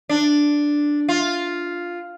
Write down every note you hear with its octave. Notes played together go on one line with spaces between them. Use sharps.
D4
F4